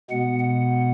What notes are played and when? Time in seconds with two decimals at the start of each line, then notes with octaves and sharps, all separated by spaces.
0.10 B2 G#3 B3 F#5
0.39 F#5